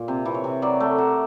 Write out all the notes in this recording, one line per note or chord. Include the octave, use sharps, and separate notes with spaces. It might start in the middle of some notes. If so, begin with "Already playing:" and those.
Already playing: A#2
C3
E3
C#5
C3
F#3 D5
A3
F#3